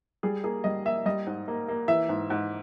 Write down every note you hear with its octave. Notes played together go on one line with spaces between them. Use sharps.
G3 G#4
A#3 G#4
G3 D#5
A#3 E5
G3 D#5
G#2
A#3
A#3
E3 E5
G#2
G#2